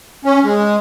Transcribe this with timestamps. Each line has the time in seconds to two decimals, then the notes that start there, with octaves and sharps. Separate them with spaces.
0.25 C#4
0.44 G#3